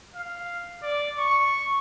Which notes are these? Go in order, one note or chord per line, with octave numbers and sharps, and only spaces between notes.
F5
D5
C#6